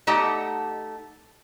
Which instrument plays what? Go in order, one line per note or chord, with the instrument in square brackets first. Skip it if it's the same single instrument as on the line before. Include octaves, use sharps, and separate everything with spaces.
[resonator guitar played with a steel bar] A3 D#4 G4 D#5 F#5 A5